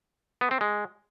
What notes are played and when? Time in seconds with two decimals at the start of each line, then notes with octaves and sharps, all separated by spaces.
0.41 B3
0.51 C4
0.61 G#3